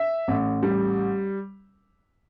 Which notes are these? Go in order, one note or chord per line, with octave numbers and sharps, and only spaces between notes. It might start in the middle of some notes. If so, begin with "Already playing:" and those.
Already playing: E5
A1
G3